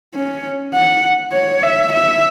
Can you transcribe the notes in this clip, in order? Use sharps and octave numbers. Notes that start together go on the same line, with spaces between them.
C#4
F#5
C#5
E5
E5